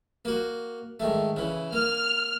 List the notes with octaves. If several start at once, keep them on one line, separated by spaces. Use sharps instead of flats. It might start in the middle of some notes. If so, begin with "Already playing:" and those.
A#3 F#4
G#2 D#3 A3
C#3 E3
A#3 F6